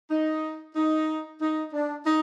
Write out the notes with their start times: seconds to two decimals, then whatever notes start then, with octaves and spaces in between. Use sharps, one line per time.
0.11 D#4
0.75 D#4
1.41 D#4
1.73 D4
2.06 D#4